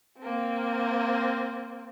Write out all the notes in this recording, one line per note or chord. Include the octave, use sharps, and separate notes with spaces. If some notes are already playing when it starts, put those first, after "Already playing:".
A#3 C4